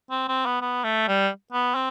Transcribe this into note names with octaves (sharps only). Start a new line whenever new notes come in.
C4
C4
B3
B3
A3
G3
B3
C4